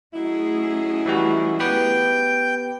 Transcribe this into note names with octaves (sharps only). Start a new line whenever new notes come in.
F#3 A3 C#4 D#4 E4 G#4
E3 G3 F#4
B3 G4 B4 G5